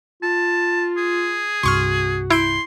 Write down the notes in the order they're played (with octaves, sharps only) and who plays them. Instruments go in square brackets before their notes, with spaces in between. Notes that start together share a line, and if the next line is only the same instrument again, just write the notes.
[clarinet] F4 [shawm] A5
[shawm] G#4
[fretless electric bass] C2 G2 [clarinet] F#4 [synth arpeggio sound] C6 C#6 F6
[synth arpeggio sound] E4 G6 D7 [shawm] C6